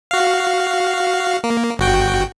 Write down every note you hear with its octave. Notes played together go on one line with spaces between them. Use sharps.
F#4 F5
A#3
G1 F#4 G5